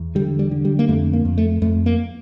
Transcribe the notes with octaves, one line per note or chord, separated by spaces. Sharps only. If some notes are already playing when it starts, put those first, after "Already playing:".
Already playing: E2
D3 G3
G3
D3
G3
A#3
F2 A3
A#3
F2
A3
F2 A3
A#3